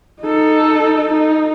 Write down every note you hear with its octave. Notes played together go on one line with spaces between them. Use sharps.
D#4 A4
D#4